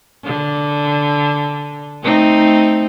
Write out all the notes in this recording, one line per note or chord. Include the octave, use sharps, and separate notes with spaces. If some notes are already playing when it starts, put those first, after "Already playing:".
D3
A3 C4 D#4